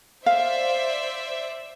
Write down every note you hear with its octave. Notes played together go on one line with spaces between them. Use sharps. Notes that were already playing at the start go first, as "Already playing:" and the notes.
C5 D5 E5 F5